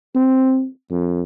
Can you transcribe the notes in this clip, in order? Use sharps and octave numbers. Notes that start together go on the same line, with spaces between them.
C4
F2